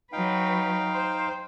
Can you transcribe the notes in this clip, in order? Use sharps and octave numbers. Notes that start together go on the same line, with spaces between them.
F#3 D#4 B4 F5 G5
C5